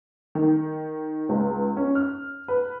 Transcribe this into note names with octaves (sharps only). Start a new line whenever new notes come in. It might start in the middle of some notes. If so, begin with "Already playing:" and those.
D#3
C#2
C#4
F6
B4